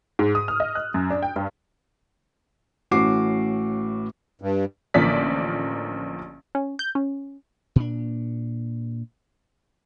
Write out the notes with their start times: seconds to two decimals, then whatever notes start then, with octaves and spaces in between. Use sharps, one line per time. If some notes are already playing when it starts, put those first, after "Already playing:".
0.19 G#2
0.35 D#6
0.48 F6
0.60 D#5
0.75 F#6
0.94 F#2
1.10 D4
1.22 G5
1.36 G2
2.91 A1 A2 C#4 F#4 D6 C7
4.42 G2
4.94 A1 D3 F3 A#3 D5 B6
6.55 C#4
6.79 G6
6.95 C#4
7.76 A#2 D4